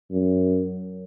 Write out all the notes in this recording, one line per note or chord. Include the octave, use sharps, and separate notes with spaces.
F#2